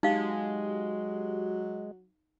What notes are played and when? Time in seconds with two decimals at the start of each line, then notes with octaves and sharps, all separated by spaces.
0.03 F#3 G#3 D#4 F#4 G4 F5